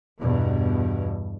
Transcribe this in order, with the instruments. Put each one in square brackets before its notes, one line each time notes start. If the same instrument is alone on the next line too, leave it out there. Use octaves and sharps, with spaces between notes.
[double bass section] E2 G2 B2